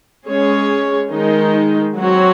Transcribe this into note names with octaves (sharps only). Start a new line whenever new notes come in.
G#3 C#4 G#4 C#5
D#3 G#3 D#4
F#3 C4 F#4 C#5